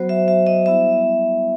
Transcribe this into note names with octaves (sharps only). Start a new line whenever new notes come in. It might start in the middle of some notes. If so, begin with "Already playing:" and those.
Already playing: F#3 B3 F#4 C5
E5
E5
D#5
G3 B3 E4 E5